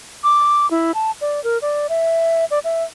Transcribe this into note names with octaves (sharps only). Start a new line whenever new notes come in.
D6
E4
A5
D5
A#4
D5
E5
D5
E5